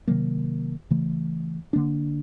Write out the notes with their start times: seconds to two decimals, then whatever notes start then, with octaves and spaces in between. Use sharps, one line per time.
0.08 C3 D#3 F#3 A#3
0.90 C#3 E3 A3
1.73 D3 F3 A#3 D4